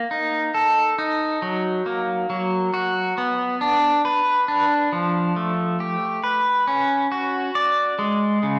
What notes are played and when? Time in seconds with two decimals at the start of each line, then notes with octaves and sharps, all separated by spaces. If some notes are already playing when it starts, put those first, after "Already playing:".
Already playing: A#3
0.11 D#4
0.54 A4
0.98 D#4
1.42 F#3
1.86 A#3
2.30 F#3
2.74 F#4
3.18 B3
3.61 D4
4.05 B4
4.48 D4
4.93 F3
5.36 A3
5.80 G4
6.24 B4
6.68 C#4
7.12 F#4
7.55 D5
7.99 G#3
8.43 C#3